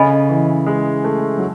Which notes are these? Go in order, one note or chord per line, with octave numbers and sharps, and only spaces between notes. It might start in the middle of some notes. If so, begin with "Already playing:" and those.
Already playing: C#3 A4 D#5 G#5 B5
E3
G#3
A3
F#3